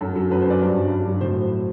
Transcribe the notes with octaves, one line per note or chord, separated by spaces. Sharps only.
F#2 A4
F#3 A4
F#2 B4
C5
F#3 D5
G2
F#3
G2
F#3
A2 C5